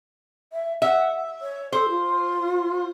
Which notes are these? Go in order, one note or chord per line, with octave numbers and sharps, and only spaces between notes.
E5
E5 F#5
C#5
A4 C5
F4